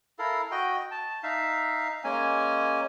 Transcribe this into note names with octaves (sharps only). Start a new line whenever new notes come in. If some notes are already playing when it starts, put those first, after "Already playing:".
E4 A4 A#4 F5
F#4 D#5 G5
A5
D#4 E5 F5
G#3 A#3 C#4 G#5